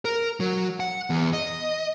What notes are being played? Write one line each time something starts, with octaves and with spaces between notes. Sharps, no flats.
A#4
F#3
F#5
E2
D#5